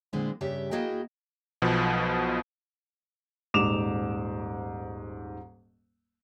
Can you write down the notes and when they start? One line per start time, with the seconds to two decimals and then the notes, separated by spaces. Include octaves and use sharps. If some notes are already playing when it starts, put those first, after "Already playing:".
0.13 A#2 D3 G#3 B3 C4 E4
0.41 G2 C#3 G4 E5
0.71 A#3 E4 F#4 G#4 D#5 G5
1.62 B1 B2 F3
3.54 D#1 G#2 D6 E7 F7